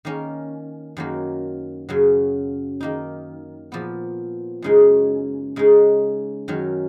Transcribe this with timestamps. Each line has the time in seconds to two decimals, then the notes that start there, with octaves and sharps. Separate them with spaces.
0.05 D#3 A#3 C#4
0.97 F#2 D#3 F#3 A#3
1.89 F#2 C#3 F#3
2.81 D#3 A#3 D#4
3.72 A#2 F3 B3
4.62 F#2 C#3 G#3 D#4
5.56 C#3 G#3 D#4
6.48 F#2 D#3 F#3 C#4